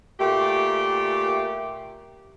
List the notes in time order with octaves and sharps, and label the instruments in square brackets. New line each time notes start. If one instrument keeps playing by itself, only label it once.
[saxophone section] A#2 A3 G4